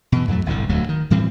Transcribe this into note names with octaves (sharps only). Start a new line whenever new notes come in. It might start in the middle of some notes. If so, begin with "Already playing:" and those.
B2 E3
F2 A2 F#3 A3
G1 C2 A2 D3
D1 D2 F#3 A3
D#3
A2 E3 G3 C4